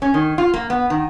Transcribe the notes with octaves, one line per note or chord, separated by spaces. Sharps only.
C#4
D#3
F4
A#3
B3
D#3